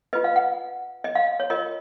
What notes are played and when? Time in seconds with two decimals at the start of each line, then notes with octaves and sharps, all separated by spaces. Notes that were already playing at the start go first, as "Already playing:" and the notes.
0.13 F4 B4 D#5
0.24 F5
0.36 F#5
1.04 D#5
1.15 F5
1.40 C#5
1.50 F4 A#4 C#5 D#5